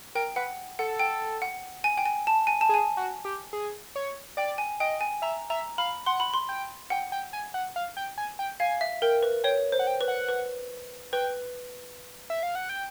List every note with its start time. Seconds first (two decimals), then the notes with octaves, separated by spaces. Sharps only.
0.15 A#4 G5
0.36 B4 F#5
0.79 A4 F#5
0.99 G5
1.42 F#5
1.84 G#5
1.97 G5
2.06 G#5
2.27 A5
2.47 G#5
2.61 A5
2.69 G#4
2.74 G#5
2.97 F#4
3.25 G4
3.53 G#4
3.96 C#5
4.37 D5 G5
4.58 G#5
4.80 D#5 G5
5.01 G#5
5.22 E5 A#5
5.50 E5 A#5
5.78 F5 B5
6.06 F#5 C6
6.20 B5
6.34 C6
6.49 G5
6.90 F#5 G5
7.12 G5
7.33 G#5
7.54 F#5
7.76 F5
7.97 G5
8.18 G#5
8.39 G5
8.60 F5 G#5
8.81 E5
9.02 A#4 G5
9.23 B4
9.44 C#5 G5
9.72 C5
9.79 F#5
9.87 G5
10.01 B4
10.08 F#5
10.29 B4
11.13 B4 G5
12.30 E5
12.43 F5
12.55 F#5
12.69 G5